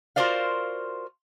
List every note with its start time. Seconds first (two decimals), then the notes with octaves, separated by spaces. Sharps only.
0.16 F4 F#4 A#4 C5 D5 F5